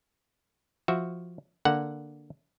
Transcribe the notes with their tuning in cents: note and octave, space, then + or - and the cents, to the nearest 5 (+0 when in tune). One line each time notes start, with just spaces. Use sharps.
F3 +0 F#4 +0 E5 +0
D3 +0 A#3 +0 F#5 +0